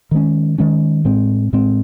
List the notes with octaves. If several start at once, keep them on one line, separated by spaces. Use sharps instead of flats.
D#3 G#3 C#4
D#3 G#3 C#4
A2 G#3 C4
A2 G#3 C4